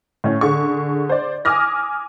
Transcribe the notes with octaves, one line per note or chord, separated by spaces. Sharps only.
A2 C#4
D3 G#4 C#6
C5 D5
G#5 D6 D#6 F6 A#6